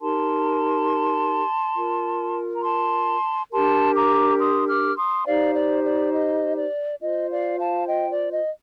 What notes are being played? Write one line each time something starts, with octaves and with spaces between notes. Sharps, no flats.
D#4 G4 A#4 A5 C6
F4 A#4
A#5
A5 C6
D4 G4 A#4 A5 C6
A#5 D6
C6 D#6
D6 F6
C6 D#6
D#4 G4 C5 D5 F5
D5
D5
D#5
D5
F4 C5 D#5
D5 F5
F5 A5
D#5 G5
D5
D#5